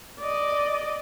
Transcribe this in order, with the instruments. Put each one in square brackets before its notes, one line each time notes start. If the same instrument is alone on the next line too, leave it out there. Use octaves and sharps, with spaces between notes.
[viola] D5 D#5